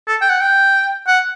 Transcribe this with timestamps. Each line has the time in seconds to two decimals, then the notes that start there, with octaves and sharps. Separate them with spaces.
0.07 A4
0.21 G5
0.29 F#5
0.41 G5
1.07 F#5